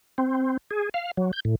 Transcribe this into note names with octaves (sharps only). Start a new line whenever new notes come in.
C4
G#4
F5
F#3
G6
A2